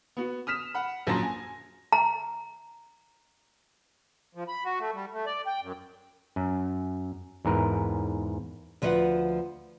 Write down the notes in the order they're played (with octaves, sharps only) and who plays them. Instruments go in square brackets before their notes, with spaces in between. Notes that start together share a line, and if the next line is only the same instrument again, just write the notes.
[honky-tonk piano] B3 F#4
D#6 F6 B6 E7
F#5 B5
A#1 F#2 F#4 A5 C6 A#6
G#5
[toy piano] A#5
[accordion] F3
B5
F#4
A3
G3
A3
D5
G5
F#2
[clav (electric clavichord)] F#2
E2 G#2 A#4 B4
[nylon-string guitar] D2 F3 B4 E5 F#5